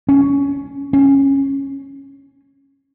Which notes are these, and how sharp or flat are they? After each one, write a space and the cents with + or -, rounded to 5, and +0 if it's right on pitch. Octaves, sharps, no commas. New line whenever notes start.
C#4 +15
C#4 -15